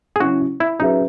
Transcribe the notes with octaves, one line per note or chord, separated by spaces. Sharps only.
G#4
C#3 F#3 C#4 E4 F#4
E4
F#3 C#4 D#4 G#4 B4 E5